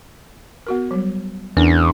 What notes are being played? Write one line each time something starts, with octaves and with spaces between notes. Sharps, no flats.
B3 F#4 A#4
F#3 G3
E2 C#4 D4 A#4